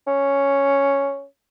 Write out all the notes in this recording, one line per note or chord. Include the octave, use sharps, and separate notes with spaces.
C#4